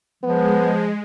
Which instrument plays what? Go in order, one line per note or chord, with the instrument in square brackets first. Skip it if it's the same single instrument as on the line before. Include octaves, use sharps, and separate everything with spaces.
[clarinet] F3 [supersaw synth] G#3 [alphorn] B3